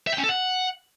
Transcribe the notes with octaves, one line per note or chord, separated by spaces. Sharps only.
E5
G5
C#4
A4
F#5